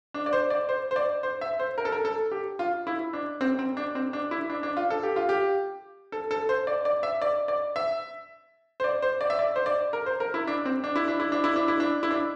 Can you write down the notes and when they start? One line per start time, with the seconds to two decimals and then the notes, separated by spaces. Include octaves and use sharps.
0.14 D4
0.26 D5
0.33 C5
0.50 D5
0.69 C5
0.91 C5
0.96 D5
1.23 C5
1.41 E5
1.60 C5
1.78 A#4
1.85 A4
1.92 A#4
2.05 A4
2.32 G4
2.59 F4
2.87 E4
3.13 D4
3.41 C4
3.59 C4
3.77 D4
3.95 C4
4.13 D4
4.31 E4
4.50 D4
4.63 D4
4.77 F4
4.90 A4
5.03 G4
5.16 F4
5.29 G4
6.12 A4
6.31 A4
6.49 C5
6.67 D5
6.85 D5
7.03 E5
7.22 D5
7.48 D5
7.76 E5
8.80 C5
8.84 D5
9.02 C5
9.21 D5
9.30 E5
9.39 D5
9.56 C5
9.66 D5
9.93 A#4
10.06 C5
10.20 A#4
10.34 E4
10.47 D4
10.65 C4
10.84 D4
10.96 E4
11.08 D4
11.20 E4
11.32 D4
11.44 E4
11.56 D4
11.68 E4
11.80 D4
12.03 E4
12.11 D4